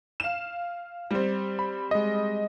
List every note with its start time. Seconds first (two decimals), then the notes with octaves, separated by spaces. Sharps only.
0.20 F5 E7
1.11 G3 C4
1.59 B5
1.91 G#3 D#5